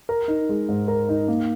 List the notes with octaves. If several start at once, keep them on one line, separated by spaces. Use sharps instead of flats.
A#4
D#4
G#3
G#2
A#4
D#4
A#3